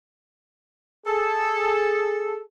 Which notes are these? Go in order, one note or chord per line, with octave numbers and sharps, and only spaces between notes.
G#4 A4